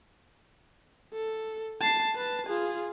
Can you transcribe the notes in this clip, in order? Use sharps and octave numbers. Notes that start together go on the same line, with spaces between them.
A4
A5 C7
B4 A5
F4 G#4